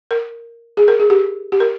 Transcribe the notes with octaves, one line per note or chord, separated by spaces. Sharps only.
A#4
G#4
A#4
G#4
G4
G4
A#4